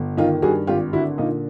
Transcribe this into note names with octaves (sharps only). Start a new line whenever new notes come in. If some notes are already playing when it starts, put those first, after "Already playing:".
Already playing: G1
D#3 D#4 F4
G2 F#4 G#4
G#1 F4 G4
D3 E4 F#4
A#2 D#4 F4